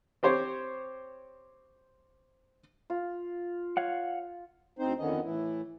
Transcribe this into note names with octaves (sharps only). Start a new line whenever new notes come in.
C4 G4 C5 C#5
F4
C#5 F5 F#5
D2 C4 D#4 C5
F2 D3 D#3 B3 C#4 D#5
A2 E3 E4